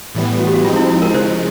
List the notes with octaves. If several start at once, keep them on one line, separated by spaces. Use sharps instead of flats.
A2 E3 G3 B3
F#4
G4
F#4
F3 G#3 C4 D#4 F4
E4
E4
A#4
C#3 F3 G#3 C5